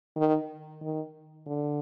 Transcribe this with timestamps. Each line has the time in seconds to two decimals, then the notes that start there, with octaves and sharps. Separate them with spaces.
0.16 D#3
0.82 D#3
1.46 D3